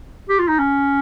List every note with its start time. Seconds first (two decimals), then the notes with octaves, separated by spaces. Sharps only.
0.29 G4
0.39 F4
0.48 D#4
0.59 C#4